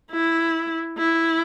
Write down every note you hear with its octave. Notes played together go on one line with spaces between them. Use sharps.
E4
E4